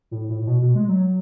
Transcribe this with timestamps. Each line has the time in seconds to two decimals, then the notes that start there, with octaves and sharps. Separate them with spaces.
0.11 A2
0.29 A2
0.40 A2
0.47 B2
0.62 B2
0.75 G#3
0.88 F#3